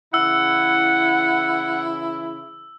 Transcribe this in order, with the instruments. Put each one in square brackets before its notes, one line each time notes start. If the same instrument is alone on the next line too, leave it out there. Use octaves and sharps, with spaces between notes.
[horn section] C#3 E3 E4 [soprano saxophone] F#5 [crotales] E6